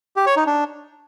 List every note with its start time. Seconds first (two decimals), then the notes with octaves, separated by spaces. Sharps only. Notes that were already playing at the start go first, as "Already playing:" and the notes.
0.16 G4
0.26 C#5
0.36 D#4
0.46 D4